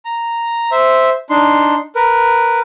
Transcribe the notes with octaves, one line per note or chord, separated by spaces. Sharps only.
A#5
C5 E5
D4 D#4 C6
A#4 B4